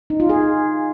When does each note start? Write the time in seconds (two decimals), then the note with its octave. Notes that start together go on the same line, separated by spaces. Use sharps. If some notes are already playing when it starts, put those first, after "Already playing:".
0.10 D#4
0.20 F4
0.29 G#4